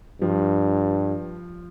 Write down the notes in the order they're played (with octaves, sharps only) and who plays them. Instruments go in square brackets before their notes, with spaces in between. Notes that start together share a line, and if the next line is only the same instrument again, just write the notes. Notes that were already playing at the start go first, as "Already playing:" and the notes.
[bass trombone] G2 [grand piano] F3